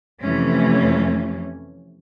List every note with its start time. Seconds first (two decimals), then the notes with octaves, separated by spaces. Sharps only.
0.21 F2 C3 E3 A3 C#4